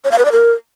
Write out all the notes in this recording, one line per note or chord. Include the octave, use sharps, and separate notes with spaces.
C#5
F5
B4
D5
A#4